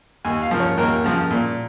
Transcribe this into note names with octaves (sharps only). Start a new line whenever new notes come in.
D#2 G#5
F5
C#3 F3 A#4
C#5
D#2 A#4
C#3 F3
A#2